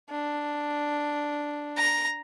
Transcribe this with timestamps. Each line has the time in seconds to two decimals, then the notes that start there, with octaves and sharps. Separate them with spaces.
0.10 D4
1.77 A#5